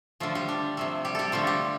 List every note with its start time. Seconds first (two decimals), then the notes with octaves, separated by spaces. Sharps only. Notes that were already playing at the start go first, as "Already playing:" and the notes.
0.20 D3 F3 A3 F4
0.35 G3 G4
0.49 D4
0.77 C3 F3 A3
1.05 G3 G4
1.15 G3 G4 A4
1.32 D3 F3 A3 F4
1.47 G3 G4